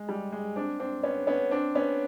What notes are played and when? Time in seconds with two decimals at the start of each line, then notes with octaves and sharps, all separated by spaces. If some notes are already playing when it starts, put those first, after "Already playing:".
Already playing: G#3
0.09 G3
0.32 G#3
0.56 C4 D4
0.79 C4 D4
1.03 B3 C#4
1.27 B3 C#4
1.51 C4 D4
1.75 B3 C#4